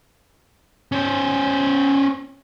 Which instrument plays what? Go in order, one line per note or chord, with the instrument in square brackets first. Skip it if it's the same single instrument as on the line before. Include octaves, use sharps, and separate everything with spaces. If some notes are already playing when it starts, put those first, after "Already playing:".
[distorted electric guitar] C#4 C5